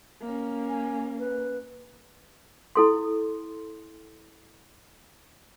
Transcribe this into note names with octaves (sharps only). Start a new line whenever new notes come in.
A#3 C#4
G#5
B4
E4 A4 C6